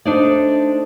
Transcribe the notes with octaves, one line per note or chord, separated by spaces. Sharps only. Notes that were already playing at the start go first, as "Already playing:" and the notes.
A3 D4 D#4 C5 D5